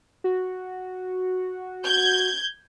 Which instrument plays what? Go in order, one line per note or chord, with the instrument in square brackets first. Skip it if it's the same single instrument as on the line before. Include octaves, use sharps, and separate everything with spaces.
[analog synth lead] F#4
[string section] G6 G#6